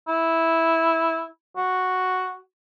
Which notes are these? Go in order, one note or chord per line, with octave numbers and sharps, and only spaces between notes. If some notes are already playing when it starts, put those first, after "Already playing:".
E4
F#4